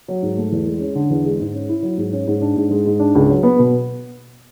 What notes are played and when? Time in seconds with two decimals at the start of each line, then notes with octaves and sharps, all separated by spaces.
0.08 F#3
0.22 G#2
0.37 A3
0.52 E2
0.66 G#3
0.80 C#4
0.95 D3
1.10 E2
1.25 G#3
1.40 G#2
1.54 C#4
1.69 E4
1.83 F#3
1.98 G#2
2.13 C#4
2.27 G#2
2.41 D4
2.56 G#2
2.71 G#3
2.86 G#2
2.99 D4
3.15 C#2
3.29 F#3
3.43 B3
3.59 B2